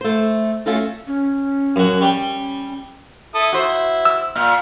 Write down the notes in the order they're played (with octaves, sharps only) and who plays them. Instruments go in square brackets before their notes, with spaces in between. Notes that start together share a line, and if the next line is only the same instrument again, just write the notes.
[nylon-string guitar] A3 C5
A3 C#4 F4 F#4 A4
[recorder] C#4
[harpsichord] F#2 F#4
G3 G5
[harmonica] E4 A4 D#6
[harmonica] E4 [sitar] F#4 C5
[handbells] E6
[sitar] A#2 [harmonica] F6